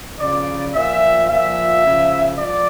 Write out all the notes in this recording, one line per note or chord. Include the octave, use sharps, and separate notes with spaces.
C#3 F3 D5
A#2 F3 E5
A#2 F3 E5
C#3 F3
F3 D5